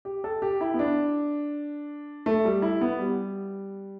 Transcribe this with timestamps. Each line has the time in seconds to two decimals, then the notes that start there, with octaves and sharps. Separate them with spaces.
0.05 G4
0.24 A4
0.42 G4
0.61 E4
0.74 B3
0.79 D4
2.26 A3
2.45 G3
2.62 E4
2.81 B3
2.99 G3